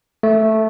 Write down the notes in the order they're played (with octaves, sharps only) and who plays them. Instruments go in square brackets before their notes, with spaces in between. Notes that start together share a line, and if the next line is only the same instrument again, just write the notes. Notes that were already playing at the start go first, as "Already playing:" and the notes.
[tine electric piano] A3